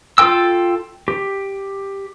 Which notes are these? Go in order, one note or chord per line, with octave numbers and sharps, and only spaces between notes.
F4 A4 G5 E6
G4